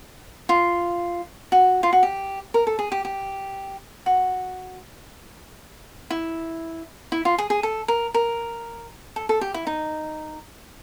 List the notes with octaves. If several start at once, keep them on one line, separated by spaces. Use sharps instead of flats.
F4
F#4
F4
F#4
G4
A#4
A4
G#4
G4
G4
F#4
E4
E4
F4
G#4
G#4
A4
A#4
A#4
A4
A4
G4
E4
D#4